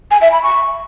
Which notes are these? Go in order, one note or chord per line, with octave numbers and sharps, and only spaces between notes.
G#5
E5
B5
C#6